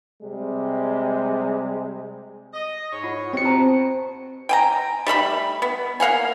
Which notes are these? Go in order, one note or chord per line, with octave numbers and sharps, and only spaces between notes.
C3 G3 G#3
D#5
G#2 C#5
F4 F#5 B5
B2 C4 F4 G4 C#7
C5 A5 A#5
G5 G#5 A#5
G3 A3 A4 B5
B3
A#3 F5 F#5 G#5